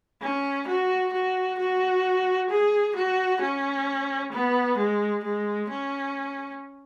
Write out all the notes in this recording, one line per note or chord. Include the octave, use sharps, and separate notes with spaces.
C#4
F#4
F#4
F#4
G#4
F#4
C#4
B3
G#3
G#3
C#4